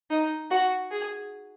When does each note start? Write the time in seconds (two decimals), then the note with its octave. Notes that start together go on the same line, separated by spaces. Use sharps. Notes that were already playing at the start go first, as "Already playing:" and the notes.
0.10 D#4
0.51 F#4
0.91 G#4